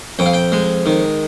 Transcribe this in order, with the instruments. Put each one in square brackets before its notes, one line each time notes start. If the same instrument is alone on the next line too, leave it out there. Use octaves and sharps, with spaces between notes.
[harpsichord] F2 G5
F5
G5
G#3
D#3